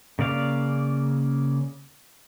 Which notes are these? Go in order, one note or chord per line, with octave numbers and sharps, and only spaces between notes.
C#3 A#3 D5 F5